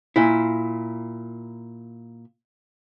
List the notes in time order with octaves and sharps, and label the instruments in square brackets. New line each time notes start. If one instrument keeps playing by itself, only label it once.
[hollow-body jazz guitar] A#2 E4